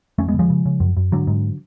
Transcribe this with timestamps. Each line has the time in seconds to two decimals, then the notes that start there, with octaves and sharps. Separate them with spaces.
0.18 F2 A3 C#4
0.28 G#3 B3
0.34 D3
0.39 F3 G#3
0.50 C#3
0.66 C#3
0.80 F#2
0.97 F#2
1.12 G#2 D3 F#3
1.27 G#2